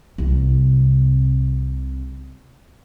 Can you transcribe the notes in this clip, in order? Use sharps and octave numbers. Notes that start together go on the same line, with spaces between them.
C2 C3